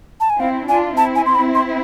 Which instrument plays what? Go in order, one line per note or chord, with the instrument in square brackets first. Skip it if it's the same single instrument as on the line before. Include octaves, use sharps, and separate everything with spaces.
[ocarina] A5
G#5
[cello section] C4 E4 [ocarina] F5
[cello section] D4 F4 [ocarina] G#5
[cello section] C4 E4 [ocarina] A5
[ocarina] G#5
C6
B5
C6